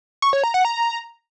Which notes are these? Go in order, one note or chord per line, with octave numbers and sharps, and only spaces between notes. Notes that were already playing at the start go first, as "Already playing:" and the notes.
C#6
C#5
A#5
F#5
A#5